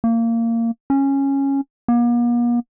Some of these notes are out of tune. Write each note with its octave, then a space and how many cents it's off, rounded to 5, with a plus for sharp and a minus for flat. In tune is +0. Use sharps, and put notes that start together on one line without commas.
A#3 -20
C#4 -10
A#3 +45